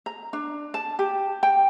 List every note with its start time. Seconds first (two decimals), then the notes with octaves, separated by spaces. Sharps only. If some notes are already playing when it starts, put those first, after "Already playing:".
0.06 A#5
0.33 D4
0.74 A5
0.99 G4
1.43 G5